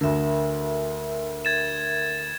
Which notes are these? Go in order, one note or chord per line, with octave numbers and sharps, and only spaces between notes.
D2 D3 A#4 E5
G#6 A6 E7